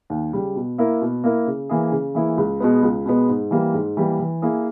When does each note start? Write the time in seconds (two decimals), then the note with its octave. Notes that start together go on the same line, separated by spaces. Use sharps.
0.10 D#2
0.33 C#3 G3
0.56 B2
0.78 A#3 E4 A#4
1.02 B2
1.24 A#3 E4 A#4
1.47 C#3
1.69 E3 A#3 E4 G#4
1.92 C#3
2.15 E3 A#3 E4 G#4
2.38 C#2
2.60 B2 G#3 B3
2.83 C#2
3.06 B2 G#3 B3
3.29 G#2
3.51 E3 G3 A#3
3.74 G#2
3.97 E3 G3 A#3
4.19 E3
4.42 A#3 E4 G#4